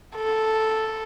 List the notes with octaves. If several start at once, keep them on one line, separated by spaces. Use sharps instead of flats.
A4